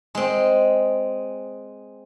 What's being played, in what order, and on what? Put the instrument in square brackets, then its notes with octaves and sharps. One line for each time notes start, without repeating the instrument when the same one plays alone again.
[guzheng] G#3 C4